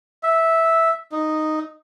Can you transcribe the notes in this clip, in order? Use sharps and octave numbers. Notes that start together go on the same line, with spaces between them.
E5
D#4